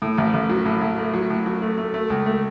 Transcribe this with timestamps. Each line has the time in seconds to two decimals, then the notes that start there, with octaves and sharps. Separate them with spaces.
0.02 A2
0.18 A1
0.34 A1
0.50 F#3
0.65 A2
0.81 A2
0.98 A3
1.14 F#3
1.30 A2
1.46 F#3
1.62 A3
1.78 A3
1.94 A3
2.10 C#2
2.26 A3